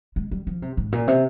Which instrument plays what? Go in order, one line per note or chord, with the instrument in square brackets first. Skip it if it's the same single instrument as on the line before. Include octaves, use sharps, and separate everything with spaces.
[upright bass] G#3
G3
F3
C3
G#2
A#2
C3